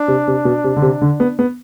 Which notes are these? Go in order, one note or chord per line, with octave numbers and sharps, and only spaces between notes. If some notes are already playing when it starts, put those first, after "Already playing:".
Already playing: D4
C3
C3
B2
C3
D3
C3
D3
B3
B3